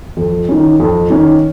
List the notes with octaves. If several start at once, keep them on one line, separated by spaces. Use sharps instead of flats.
F2
D#3 C#4
F2
D#3 C#4